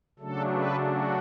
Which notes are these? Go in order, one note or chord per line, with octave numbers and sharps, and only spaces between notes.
C#3 F#3 A3 D4 A4
B4
F#4